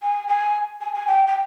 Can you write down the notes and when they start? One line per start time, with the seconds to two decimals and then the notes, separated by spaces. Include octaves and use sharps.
0.02 G#5
0.28 G#5
0.81 G#5
0.94 G#5
1.07 G5
1.27 G5